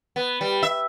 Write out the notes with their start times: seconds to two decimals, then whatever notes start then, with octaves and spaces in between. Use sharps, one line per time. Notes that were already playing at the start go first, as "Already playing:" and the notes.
0.16 B3
0.41 G3
0.63 E5